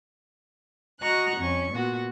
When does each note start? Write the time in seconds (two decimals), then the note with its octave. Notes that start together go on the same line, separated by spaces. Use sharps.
1.01 F#4 D#5 F#5 A#5 C#6 F#6
1.36 F2 C#4 C#6
1.73 A#2 B3 F#4